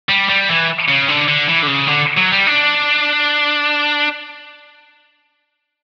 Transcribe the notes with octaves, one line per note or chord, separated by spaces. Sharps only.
G3
G3
E3
C#3
D3
D3
E3
D3
C#3
D3
F#3
G3
D4